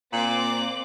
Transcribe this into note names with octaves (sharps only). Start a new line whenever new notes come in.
A#2 C4 D6 F#7